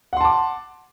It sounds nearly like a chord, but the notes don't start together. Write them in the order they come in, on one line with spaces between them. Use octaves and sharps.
F#5 C6 A5 D6